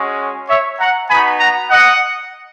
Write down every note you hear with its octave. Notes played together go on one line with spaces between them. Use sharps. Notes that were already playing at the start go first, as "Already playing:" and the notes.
Already playing: G#3 C#4 F#4
C#5 E5
F#5 A#5
B3 D#4 F#4 G#5 B5
F#5 A#5
D#5 F#5